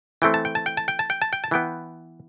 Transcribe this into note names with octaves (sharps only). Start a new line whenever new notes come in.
E3 A3 C4 G5
A5
G5
A5
G5
A5
G5
A5
G5
A5
G5
A5
E3 B3 G5